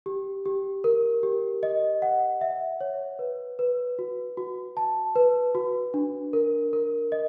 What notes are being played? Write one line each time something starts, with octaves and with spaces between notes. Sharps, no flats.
G4
G4
A#4
G4
D#5
F#5
E5
C#5
B4
B4
F#4
F#4
A5
B4
F#4
D4
A#4
A#4
D#5